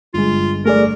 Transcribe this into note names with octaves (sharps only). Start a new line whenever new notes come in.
G1 G#3 F4
A3 G#4 A#4 D5